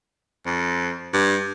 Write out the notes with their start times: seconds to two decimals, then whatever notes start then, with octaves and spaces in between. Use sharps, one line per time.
0.46 F2
1.13 G2